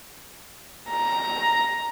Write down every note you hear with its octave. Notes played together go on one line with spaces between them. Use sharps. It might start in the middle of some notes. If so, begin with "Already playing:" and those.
A#5